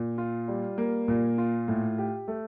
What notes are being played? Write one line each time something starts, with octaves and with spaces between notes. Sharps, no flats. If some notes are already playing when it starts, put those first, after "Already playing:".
Already playing: A#2
F4
G3
A#3
A#2
F4
A2
G4
A3